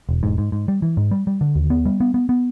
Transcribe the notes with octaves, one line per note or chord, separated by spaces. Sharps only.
E1
G#2
G#2
G#2
G3
E3
G#2
G3
G3
D3
D#2
B3
G3
B3
B3
B3